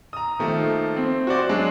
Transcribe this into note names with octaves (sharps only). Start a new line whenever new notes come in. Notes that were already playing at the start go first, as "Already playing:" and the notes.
A#5 D#6
D#3 F3 A3 A#3
C4
F#4 C5 D5
F#3 G#3 D4